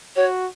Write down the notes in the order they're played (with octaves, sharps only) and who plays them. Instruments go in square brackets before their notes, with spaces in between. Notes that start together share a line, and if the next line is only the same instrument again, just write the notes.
[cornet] F#4 [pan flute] C#5